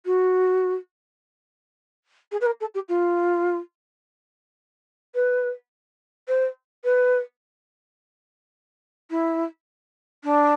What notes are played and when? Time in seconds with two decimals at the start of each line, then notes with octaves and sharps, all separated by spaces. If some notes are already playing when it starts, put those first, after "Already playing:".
0.05 F#4
2.32 G#4
2.41 B4
2.46 A#4
2.60 A4
2.74 G4
2.88 F4
5.15 B4
6.28 C5
6.84 B4
9.10 E4
10.23 D4